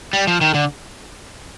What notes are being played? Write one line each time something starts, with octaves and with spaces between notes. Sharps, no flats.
G3
F3
D#3
D3